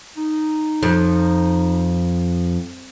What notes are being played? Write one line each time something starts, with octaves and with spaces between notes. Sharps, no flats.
D#4
F2